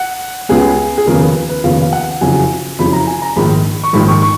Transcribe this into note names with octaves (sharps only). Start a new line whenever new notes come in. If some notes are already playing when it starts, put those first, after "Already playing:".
Already playing: F#5
C#2 C#3 G#3 B3 G#4
G#4
F1 D#2 C#3 F3 B3 A#4
B4
B4
F1 D#2 C#3 F3 B3 F5
F5
F#5
F#1 F2 C#3 F#3 G#5
F#1 F2 C#3 F#3 B5
A#5
G#5
A#5
A#1 G#2 D#3 G#3 B5
C#6
A#1 G#2 D#3 G#3 B5
C#6
C#6